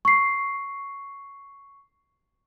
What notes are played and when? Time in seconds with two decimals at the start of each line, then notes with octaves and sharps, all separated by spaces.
0.05 C#6 C7